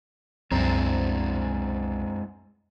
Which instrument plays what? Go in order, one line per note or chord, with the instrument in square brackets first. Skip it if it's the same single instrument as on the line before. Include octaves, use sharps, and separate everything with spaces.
[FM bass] C2 [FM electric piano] F#2 C5 A#5 [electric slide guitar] G#3 D4 E4 [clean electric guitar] C4